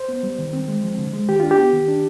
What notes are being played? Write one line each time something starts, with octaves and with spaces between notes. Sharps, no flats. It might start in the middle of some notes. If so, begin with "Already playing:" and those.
Already playing: C5
B3
G3
D#3
C4
G#3
F3
D3
G#3
D#3 G4
D4 F4
G4
B3
D#3
D4